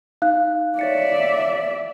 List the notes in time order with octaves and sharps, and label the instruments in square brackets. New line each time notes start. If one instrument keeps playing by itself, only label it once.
[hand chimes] D#4 F#6 [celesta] F5
[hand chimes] C#5 A6 C#7 [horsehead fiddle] D5 E5